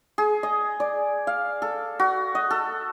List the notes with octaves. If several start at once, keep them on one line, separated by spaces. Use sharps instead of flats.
G#4
D#5
D5
F5
A4
F#4
D#5
A4